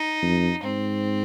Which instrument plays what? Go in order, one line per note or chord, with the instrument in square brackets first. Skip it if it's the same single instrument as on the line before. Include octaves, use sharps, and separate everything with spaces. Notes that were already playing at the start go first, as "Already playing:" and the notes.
Already playing: [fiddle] D#4
[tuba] F2
[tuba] G#2 [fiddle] C4